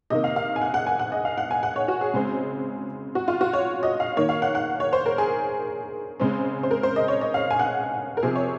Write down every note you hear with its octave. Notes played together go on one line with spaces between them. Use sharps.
C3 D#3 A#3 D#5
F5
F5
G#5
F#5
F#5
G#5
F#5
D#5
F5
F#5
G#5
F#5
C#5
F#4
G#4
C#3 G#3 C4
F#4
F4
F#4
C#5
D#5
F5
D#3 A#3 C#5
F5
F#5
F#5
C#5
C5
A#4
G#4
C#3 G#3 C4
C5
A#4
C5
D#5
C#5
D#5
F5
G#5
F#5
A#4
C3 F3 C4 G#4
C#5